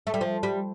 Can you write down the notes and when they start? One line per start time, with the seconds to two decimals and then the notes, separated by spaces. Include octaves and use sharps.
0.07 A3
0.14 G3
0.21 F3
0.43 G3